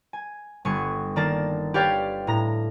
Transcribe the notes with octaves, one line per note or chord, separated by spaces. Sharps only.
G#5
G1 B3 G#5 C#6
D#3 A#3 D5 A5 A#6
G4 B4 C#5 D5 F5 G5
A2 A#5 A#6